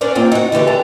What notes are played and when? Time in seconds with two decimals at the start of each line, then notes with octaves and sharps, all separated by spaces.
0.01 C#4 D4 A#4 C5 D5
0.15 A3 A#3 C4 F4
0.32 D#4 F#4
0.52 D3 E3 G4 A4
0.67 D3 E3 G4 A5 A#5